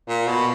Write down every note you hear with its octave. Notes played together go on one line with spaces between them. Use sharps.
A#2
B2